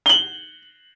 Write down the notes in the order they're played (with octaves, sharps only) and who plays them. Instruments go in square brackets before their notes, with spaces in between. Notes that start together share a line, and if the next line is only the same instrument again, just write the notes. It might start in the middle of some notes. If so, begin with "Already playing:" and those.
[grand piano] F#7 G7